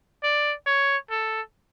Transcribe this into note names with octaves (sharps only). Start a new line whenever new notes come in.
D5
C#5
A4